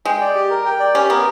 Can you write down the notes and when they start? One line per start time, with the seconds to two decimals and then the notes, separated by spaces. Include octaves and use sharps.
0.05 G#3 G5
0.21 D5
0.35 G4
0.50 A#4
0.65 G5
0.80 D5
0.94 C#4 G4
1.10 B3 A#4